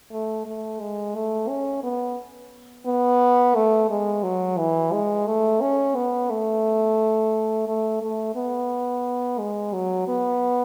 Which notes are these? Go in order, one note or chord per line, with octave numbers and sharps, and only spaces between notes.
A3
A3
G#3
A3
C#4
B3
B3
A3
G#3
F#3
E3
G#3
A3
C#4
B3
A3
A3
A3
B3
G#3
F#3
B3